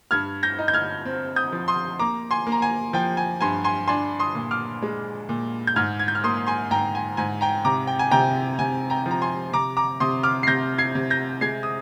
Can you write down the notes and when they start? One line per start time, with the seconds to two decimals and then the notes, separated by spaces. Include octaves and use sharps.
0.11 G2 F6 G#6
0.43 G6 A#6
0.59 D#4
0.68 G6
0.74 F6 G#6
1.05 C4
1.36 D#6 G6
1.52 F3
1.68 C6 D#6
1.99 A#3 A#5 D6
2.31 G#5 C6
2.47 A#3
2.52 A#5
2.62 G#5
2.93 F3 G5
3.17 G#5
3.41 G2 G#5 C6
3.64 G#5 C6
3.88 D4 G#5 C6
4.20 C6 D#6
4.35 A#2
4.51 D6 F6
4.82 G#3
5.29 A#2
5.67 G6
5.76 G#2 F6 G#6
5.99 G#6
6.08 G6
6.15 F6
6.24 A#3 C6 D#6
6.47 G#5 C6
6.71 G#2 G5 A#5
6.95 G#5
7.17 G#2 G#5
7.41 G5 A#5
7.65 C3 A#5 D6
7.87 G5
7.99 G#5
8.11 C3 G5 A#5
8.59 C3 G#5
8.90 G5 A#5
9.06 F3
9.11 A#5
9.22 G#5 C6
9.53 C3 A#5 D6
9.77 A#5 D6
10.00 C3 C6 D#6
10.23 D6 F6
10.43 C7
10.47 C3 G6 A#6
10.78 G#6 C7
10.95 C3
11.10 G6 A#6
11.41 G#3 G#6 C7
11.63 D#6